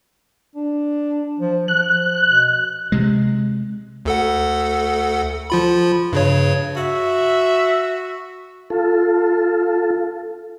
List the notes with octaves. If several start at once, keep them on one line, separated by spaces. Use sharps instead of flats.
D4
F3
F3 F#6
B2
C3 G#3
D2 A4 F#5
F3 F4 B5
G2 C#3 C#5
F#4 E5
F4 A4